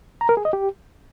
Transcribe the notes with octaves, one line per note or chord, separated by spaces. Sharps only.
A#5
A#4
G#4
D#5
G4